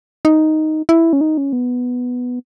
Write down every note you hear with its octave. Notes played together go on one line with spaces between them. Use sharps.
D#4
E4
C#4
D#4
C#4
B3